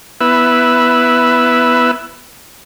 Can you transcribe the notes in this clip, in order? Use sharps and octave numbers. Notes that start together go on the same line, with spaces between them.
B3 E4 B4 E6